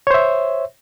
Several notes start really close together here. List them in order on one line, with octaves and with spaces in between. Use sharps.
C#5 C5 E5